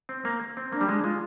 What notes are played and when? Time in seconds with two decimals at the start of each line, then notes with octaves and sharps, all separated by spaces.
0.09 C4
0.25 A#3
0.57 C4
0.72 A#3 D4
0.81 G3
0.88 G#3 D4
1.04 G#3 F4